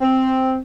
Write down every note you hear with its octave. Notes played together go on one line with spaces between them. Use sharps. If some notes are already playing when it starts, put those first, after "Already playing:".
C4